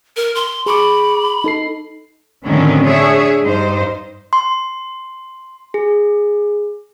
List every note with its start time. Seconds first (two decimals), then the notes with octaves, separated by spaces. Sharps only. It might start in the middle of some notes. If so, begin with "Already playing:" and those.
0.16 A#4
0.35 C6
0.66 G#4 B5 C#6 D6
1.44 D#4 A4 C7
2.46 A2 D3 D#3 F#3 C4 C#4
2.86 D4 G#4 C#5 E5
3.43 G2 D#4 C5
4.33 C6
5.74 G#4